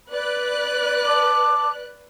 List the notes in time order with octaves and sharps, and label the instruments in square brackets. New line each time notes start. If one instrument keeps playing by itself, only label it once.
[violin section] B4 D5 F#6
[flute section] A5 D6